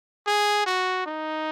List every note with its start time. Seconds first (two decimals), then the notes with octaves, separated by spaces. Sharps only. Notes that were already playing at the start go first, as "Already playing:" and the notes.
0.27 G#4
0.66 F#4
1.06 D#4